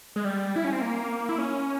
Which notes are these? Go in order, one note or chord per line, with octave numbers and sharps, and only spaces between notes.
G#3
G3
E4
C#4
C4
A#3
E4
C#4